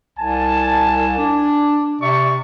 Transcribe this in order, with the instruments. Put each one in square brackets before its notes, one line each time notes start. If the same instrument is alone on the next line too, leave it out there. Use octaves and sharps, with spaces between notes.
[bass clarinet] C2 [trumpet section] G#5 A5
[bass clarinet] D4
[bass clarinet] C3 [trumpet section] D5 E5 C#6